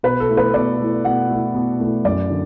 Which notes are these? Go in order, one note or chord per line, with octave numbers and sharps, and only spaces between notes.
B2 B4
A4
A3 E4
B4
B2 D5
A3 E4
B2 F#5
A3 E4
B2
A3 E4
F#2 D5
D3